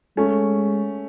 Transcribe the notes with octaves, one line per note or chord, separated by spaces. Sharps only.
G#3 A3 C#4